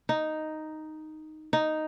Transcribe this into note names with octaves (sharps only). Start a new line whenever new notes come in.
D#4
D#4